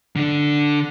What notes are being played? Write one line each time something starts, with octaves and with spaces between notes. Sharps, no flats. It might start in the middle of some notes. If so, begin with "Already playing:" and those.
D3 D4